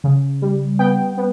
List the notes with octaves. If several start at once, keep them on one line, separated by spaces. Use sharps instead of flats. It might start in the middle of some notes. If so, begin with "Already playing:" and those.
C#3
G3
B3 G5
B3